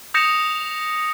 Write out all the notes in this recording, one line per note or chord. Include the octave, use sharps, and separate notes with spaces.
D#6 G6 A#6 C#7 E7 F7